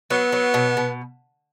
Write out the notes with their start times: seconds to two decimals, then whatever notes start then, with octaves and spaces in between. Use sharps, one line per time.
0.10 F#3 B3
0.32 F#3
0.54 B2
0.77 B2